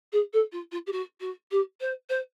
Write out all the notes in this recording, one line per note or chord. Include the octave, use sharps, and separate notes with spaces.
G#4
A4
F4
F4
G4
F#4
F#4
G4
C5
C5